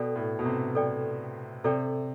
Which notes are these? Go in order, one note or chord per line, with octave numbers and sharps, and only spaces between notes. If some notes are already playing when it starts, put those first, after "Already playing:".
Already playing: B2 A4 D5 G5
A2
B2
C3
A4 D5 G5
C3 A4 D5 G5